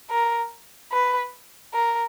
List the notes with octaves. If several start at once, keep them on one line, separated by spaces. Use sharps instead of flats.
A#4
B4
A#4